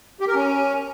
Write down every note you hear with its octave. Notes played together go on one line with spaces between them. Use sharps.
G4
A#4
C#4